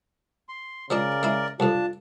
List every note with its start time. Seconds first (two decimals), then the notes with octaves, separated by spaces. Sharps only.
0.49 C6
0.90 C#3 F3 G#3 D4 A#4 D5
1.23 G#3 E4
1.60 C2 F2 D4 F4 A5